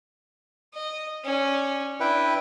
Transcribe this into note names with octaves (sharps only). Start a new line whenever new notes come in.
D#5
C#4 D5
D4 E4 B4 G5